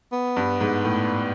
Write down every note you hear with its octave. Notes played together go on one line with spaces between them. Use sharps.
B3
G2
G#2
A2